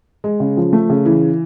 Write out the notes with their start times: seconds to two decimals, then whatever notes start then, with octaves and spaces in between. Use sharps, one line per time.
0.24 G#3
0.40 C#3
0.57 F3
0.73 A3
0.90 C#3
1.06 E3